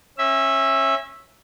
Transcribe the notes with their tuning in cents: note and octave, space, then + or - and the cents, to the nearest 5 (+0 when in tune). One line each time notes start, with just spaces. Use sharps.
C#4 -25 E5 +0